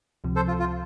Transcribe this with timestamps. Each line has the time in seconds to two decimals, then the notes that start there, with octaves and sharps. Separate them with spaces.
0.24 C#2 C3 F3
0.36 A4 C5
0.48 F4
0.59 F4